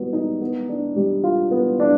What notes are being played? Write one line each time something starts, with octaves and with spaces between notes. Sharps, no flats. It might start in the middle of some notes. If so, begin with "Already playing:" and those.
Already playing: G3 B3 F#4
D#4
B3
D4
G3
F4
B3
D4